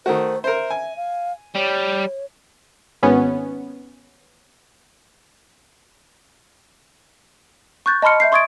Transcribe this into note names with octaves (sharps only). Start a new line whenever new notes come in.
D#3 A3 F#4 C5
A#4 C5 E5
G#5
F5
G3 C#5
G#1 B3 C#4
C#6 F#6 G6 A6
D#5 A5 B5 C6 F6 C#7
E5 G6 C7
C6 C#6 D#6 G#6 A6 D7